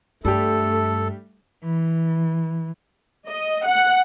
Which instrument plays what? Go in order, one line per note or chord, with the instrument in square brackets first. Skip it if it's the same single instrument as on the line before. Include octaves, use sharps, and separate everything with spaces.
[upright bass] G2 [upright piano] G3 D4 G4 [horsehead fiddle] A3 [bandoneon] A4
[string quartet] E3
[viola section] D#5
F#5